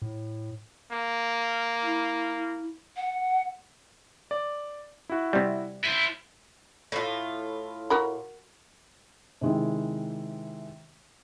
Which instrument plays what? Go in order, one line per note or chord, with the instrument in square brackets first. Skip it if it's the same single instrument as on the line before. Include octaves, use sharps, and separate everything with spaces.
[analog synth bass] A2
[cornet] A#3
[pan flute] E4
F#5
[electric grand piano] D5
E4 F#4
[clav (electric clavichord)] C3 G3
[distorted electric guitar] E4 C5 [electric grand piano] D#7
[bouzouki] A2 F4
[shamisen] F#4 A#4 B5
[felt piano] C3 D#3 G#3 C4 E4